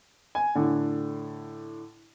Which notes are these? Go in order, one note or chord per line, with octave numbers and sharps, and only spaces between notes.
G#5
A2 D3